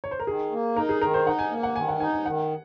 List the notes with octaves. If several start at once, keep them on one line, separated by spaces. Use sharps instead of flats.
C#5
C5
A#4
D#3 G#4
A#3
D#4 A#4
G#4
D#3 A#4
C5
D#4 F#5
G#5
A#3
F#5
D#3 G#5
F#5
D#4 G#5
G#5
D#3 F#5